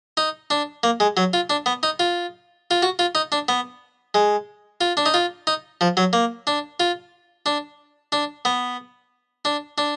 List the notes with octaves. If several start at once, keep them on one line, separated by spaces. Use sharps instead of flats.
D#4
D4
A#3
G#3
F#3
F4
D4
B3
D#4
F4
F4
F#4
F4
D#4
D4
B3
G#3
F4
D4
D#4
F4
D#4
F3
F#3
A#3
D4
F4
D4
D4
B3
D4
D4